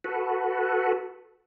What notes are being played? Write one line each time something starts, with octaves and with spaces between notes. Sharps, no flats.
F#4 A4 B4